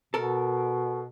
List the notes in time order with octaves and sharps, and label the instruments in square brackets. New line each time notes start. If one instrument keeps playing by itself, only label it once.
[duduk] B2 [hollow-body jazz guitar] A4 A#4